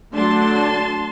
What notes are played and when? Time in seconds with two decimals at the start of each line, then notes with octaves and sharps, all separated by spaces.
0.14 D3 F#3 A3 D4 A5 C6